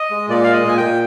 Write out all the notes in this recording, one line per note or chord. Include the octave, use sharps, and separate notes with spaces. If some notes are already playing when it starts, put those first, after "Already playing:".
Already playing: D#5
G#3
A#2 D5
G#3 F5
D#5
A#2 G#5
G5
A#2